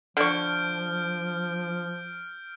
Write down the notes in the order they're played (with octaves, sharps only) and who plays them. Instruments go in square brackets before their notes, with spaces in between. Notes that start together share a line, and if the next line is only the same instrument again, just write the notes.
[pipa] D3 C#6 [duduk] F3 [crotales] F6 G6 D7